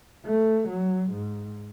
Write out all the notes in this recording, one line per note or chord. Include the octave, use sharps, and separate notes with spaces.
A3
F#3
G#2